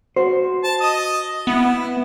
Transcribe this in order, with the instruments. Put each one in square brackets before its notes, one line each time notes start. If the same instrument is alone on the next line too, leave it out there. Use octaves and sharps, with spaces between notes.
[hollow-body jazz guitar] F#4 C5
[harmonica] A5
D#5 D#6
[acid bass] B3 [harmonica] E4